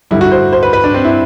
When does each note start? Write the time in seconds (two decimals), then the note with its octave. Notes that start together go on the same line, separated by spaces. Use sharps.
0.11 G2 D3 G3 E4
0.21 F#4
0.31 C5
0.53 C5
0.63 B4
0.73 B4
0.84 D4
0.94 C4
1.05 E4